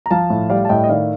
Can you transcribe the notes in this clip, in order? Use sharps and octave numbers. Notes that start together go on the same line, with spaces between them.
A#5
F3 F5 A5
A2
G3 D5 F5
A5
A2 D#5 G5
D#5
D#3 D5 F5